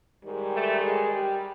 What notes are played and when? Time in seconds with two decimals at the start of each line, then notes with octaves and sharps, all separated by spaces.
0.23 G#2 D#3 G3
0.52 A3
0.81 G#3
1.09 G3